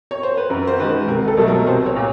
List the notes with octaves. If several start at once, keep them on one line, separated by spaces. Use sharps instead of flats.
C#5
C5
B4
F#2 A#4
C5
D#3 G#3 B4
C2 A#4
A4
B2 F#3 A3
A#4
C2 C5
C#5
A#2